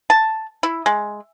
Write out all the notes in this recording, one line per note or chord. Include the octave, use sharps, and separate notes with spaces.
A5
E4
G#3